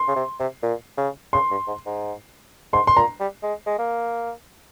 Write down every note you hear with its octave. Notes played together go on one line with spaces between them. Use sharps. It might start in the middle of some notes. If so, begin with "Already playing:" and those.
Already playing: C6
C#3
C3
C3
A#2
C#3
C#3 C6
G2
G#2
G#2
G#2 C6
C6
A#2 A#5
G3
G#3
G#3
A#3